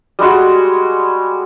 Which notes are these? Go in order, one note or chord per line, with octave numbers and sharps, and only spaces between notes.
G3 G#3 F#4